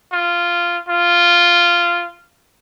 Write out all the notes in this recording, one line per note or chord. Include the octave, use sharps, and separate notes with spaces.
F4
F4